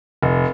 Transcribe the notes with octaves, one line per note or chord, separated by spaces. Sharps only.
F1